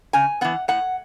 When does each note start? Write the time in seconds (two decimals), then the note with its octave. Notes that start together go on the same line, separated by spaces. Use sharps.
0.13 C#3 G#5
0.41 E3 B3 F#5
0.68 A2 F#5